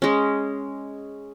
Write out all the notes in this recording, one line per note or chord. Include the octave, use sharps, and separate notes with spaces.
G#3 C#4